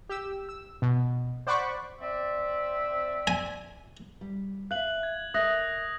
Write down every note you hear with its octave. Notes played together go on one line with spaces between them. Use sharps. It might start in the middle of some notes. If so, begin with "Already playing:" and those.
G4 E6
E6
B2
C5 D5 F#5 B5 C#6 D6
C4 D5 E5
G#5
G3
E5 F5 F#6 F#7
G#6
A#4 D#5 E5 D#6 F#6 A#6